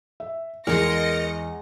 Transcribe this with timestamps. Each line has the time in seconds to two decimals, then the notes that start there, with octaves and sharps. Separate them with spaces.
0.20 E5
0.67 E2 G#3 G#4 A#4 D#5 C6 A#6 C#7